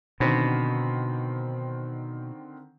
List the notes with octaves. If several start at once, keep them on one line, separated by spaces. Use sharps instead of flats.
B2 D3 D#3 C4